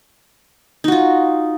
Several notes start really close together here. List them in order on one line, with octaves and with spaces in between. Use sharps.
D#4 F#4 F4